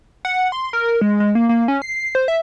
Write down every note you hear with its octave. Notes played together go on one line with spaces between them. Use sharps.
F#5
C6
A#4
G#3
G#3
A#3
A#3
C#4
C7
C5
E5